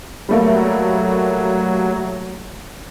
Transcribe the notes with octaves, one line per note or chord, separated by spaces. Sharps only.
F#3 G3 A3 A#3